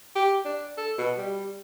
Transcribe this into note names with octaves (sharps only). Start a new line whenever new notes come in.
G4
D4
A4
B2
G3